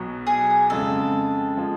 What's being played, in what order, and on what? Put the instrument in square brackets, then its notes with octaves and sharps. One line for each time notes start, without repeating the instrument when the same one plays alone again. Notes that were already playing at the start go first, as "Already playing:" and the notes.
Already playing: [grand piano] B1 B2 F#3
[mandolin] G#4
[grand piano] F2 C#3 G#3 [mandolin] A4
[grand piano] F3 G#3